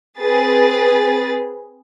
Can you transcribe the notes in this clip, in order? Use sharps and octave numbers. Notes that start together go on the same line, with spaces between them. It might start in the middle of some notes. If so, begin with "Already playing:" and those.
C4 G#4 B4 A6